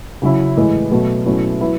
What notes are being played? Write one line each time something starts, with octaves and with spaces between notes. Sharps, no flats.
C#3 F#3 C#4 E4
A2 E3 G#3
B2 F#3 A3
B2 F#3 A3 C#4 E4
F#3 B3 E4